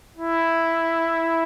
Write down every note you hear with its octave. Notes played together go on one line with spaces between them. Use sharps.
E4